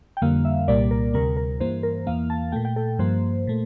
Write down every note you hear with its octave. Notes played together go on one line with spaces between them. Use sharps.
G5
F2 D3 G3 A#3 F5
E5
C2 A#2 G3 A#3 D5
A#4
D2 C3 G3 A#4
A#4
G2 E3 A#3 C5
A#4
E2 E3 A#3 F5
A5
A#2 A3 G5
G5
A4
G2 F3 A#3 C5
A#2 A3